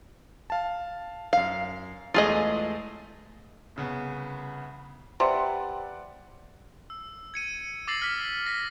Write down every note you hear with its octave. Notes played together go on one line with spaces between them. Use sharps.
F5 A5
F#2 F5 C7
E2 G#3 A3 F4 G#4 D#5
C2 C#3 B3
C3 B4 D5 F#5
E6
G#6 C#7 D#7
D6 E6 A6 A#6 C7 F#7
F6 B6
A#6 B6